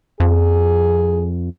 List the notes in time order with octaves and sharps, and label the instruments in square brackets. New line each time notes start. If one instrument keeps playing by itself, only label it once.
[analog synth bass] F2 [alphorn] G#4